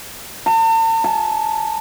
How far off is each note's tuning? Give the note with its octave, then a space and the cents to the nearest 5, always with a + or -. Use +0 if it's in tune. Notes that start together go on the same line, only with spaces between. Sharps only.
A5 +45
A5 -40